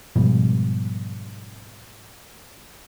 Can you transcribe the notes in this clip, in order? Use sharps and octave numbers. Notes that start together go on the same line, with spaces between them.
G#2 B2 F3 G3